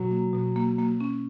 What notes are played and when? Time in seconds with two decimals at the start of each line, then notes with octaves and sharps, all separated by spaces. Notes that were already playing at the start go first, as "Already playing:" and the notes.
Already playing: B2 F#3
0.11 A#3
0.33 B2
0.56 A#3
0.78 A#3
1.00 C#4